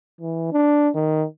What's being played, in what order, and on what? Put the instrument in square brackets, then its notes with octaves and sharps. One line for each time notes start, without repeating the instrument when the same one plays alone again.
[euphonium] E3
D4
D#3